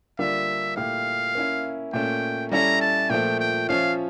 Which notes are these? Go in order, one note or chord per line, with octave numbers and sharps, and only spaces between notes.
D3 G3 A#3 D4 F4 E5
A#2 A3 E4 G4 F5
A#3 C#4 E4
A#2 A3 C#4 G5
G3 C#4 E4 A4 C#5 A#5
A5
A#2 F3 A3 G5
G5
F3 C#4 F4 C#5 E5 F5